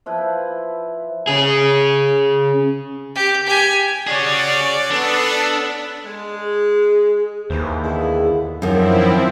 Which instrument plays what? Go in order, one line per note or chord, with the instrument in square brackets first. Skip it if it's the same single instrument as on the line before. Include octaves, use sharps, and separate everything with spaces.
[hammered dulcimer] F3 E4 B4
[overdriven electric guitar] C#4 G#4
[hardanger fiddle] G4
G4 G#5
[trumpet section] C#4 F#4 D5 [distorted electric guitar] G#4 C#5
[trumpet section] B3 A4 [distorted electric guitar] D4
[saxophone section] G#3
[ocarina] G#4
[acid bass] D#2 [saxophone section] E3 C5
[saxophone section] D3 B3 E4 [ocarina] G#4
[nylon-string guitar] F#2 D#3 [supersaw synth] F3 C4 E4